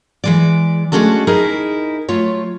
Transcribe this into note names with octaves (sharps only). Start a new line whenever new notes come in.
E3 G#3 D5
G#3 A3 C#4 D4 F#4 A4
D#4 E4 G#4 A#4 D#5
F#3 A3 F4 C#5